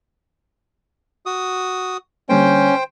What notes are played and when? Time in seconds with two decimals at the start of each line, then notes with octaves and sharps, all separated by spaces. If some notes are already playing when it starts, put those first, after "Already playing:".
1.26 F#4 D#6
2.29 D3 G3 A#3 C#4 C5 G5